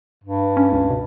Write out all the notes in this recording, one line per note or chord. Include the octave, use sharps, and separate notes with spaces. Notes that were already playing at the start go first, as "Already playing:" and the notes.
G2
C#4
C#2
B2